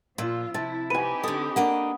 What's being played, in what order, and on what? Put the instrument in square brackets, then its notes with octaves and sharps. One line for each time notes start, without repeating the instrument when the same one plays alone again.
[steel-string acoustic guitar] A#2 [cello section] F3 F4 [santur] E6
[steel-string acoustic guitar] C3 [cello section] E4 [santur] A5
[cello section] C4 D#4 G4 [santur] B4 G#5 [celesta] D#7
[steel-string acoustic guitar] D3 A4 [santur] D#6
[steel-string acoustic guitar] A#3 D4 D#5 [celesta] F#5